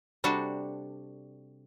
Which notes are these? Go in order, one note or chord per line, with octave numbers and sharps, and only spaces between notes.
C3 G3 D4 F#4 A4